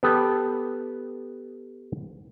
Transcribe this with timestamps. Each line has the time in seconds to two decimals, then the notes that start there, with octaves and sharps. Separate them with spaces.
0.03 B3 G4 A4